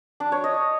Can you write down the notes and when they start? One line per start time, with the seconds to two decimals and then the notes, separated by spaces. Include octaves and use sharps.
0.20 D4
0.32 C#5
0.44 D#5